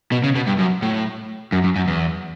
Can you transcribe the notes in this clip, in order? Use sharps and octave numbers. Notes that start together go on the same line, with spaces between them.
B2
C#3
B2
G2
F#2
A2
F#2
F#2
F#2
E2